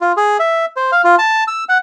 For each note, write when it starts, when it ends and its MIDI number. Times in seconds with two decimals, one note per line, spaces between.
0.01 0.12 65
0.17 0.37 68
0.39 0.65 76
0.77 0.91 72
0.92 1.02 77
1.04 1.15 65
1.19 1.44 81
1.48 1.64 88
1.69 1.78 78